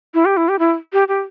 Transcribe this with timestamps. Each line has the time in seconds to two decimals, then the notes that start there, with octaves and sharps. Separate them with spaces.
0.14 E4
0.25 G4
0.37 E4
0.49 G4
0.59 E4
0.93 G4
1.08 G4